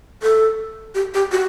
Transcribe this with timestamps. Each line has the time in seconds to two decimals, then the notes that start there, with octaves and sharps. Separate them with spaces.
0.22 A4
0.95 G4
1.14 G4
1.32 F#4